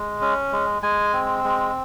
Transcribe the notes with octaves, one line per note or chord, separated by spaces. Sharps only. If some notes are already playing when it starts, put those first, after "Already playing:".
Already playing: G#3
C#4
G#3
G#3 G#5
C4
G#3